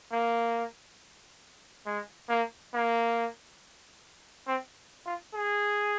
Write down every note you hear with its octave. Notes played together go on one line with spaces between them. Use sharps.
A#3
G#3
A#3
A#3
C4
F4
G#4